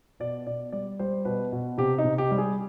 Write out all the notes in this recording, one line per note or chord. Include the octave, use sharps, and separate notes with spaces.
B2 D5
B2 D5
G3 D5
G3 C5
B2 B4
B2
C3 G4
D#4
C3
G4
G3
G#4